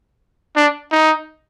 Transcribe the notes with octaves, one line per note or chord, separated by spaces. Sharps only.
D4
D#4